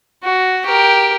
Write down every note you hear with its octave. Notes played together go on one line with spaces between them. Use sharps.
F#4
G4 A#4